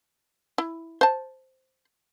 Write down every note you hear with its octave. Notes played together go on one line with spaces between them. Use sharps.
E4
C5 A5